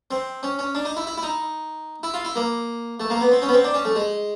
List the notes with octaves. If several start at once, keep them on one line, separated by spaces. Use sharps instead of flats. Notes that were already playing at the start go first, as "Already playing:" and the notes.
C4
C#4
C#4
D4
D#4
E4
E4
E4
D#4
E4
F4
E4
A#3
A3
A#3
B3
C4
C#4
B3
C4
D4
C#4
A3
G#3